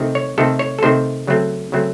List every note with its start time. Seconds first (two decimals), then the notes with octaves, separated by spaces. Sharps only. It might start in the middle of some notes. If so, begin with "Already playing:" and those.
Already playing: C3 D#3 A3 C4
0.15 C#5
0.38 C3 D#3 A3 C4 A4
0.59 C#5
0.79 A4
0.83 C3 D#3 A3 C4 C5
1.27 C#3 F#3 A3 C4
1.72 C#3 F#3 A3 C4